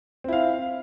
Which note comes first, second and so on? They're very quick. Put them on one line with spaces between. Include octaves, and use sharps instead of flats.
C4 E4 F5